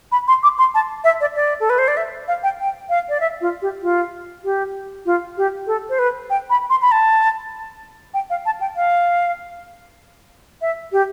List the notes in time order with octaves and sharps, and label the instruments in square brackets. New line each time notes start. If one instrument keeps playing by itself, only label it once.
[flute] B5
C6
D6
C6
A5
E5
D5
D5
A4
B4
C5
D5
E5
F5
G5
G5
F5
D5
E5
F4
G4
F4
G4
F4
G4
A4
C5
B4
G5
B5
C6
B5
A5
G5
F5
A5
G5
F5
E5
G4